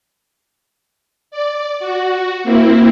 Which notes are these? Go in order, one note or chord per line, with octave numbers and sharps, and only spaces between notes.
D5
F#4
A#3 C4 E4